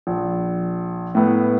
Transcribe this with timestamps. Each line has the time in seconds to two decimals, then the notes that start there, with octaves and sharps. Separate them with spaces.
0.07 A#1
1.15 A2 B3